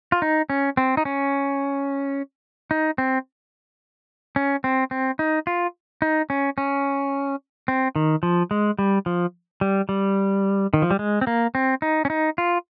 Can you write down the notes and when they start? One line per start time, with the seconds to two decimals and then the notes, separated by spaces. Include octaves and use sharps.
0.12 F4
0.22 D#4
0.50 C#4
0.77 C4
0.97 D#4
1.05 C#4
2.71 D#4
2.98 C4
4.36 C#4
4.64 C4
4.91 C4
5.19 D#4
5.47 F4
6.02 D#4
6.30 C#4
6.58 C#4
7.68 C4
7.96 D#3
8.23 F3
8.51 G#3
8.79 G3
9.06 F3
9.61 G3
9.89 G3
10.74 D#3
10.82 F3
10.91 G3
10.99 G#3
11.21 C4
11.27 A#3
11.55 C4
11.82 D#4
12.05 C#4
12.10 D#4
12.38 F4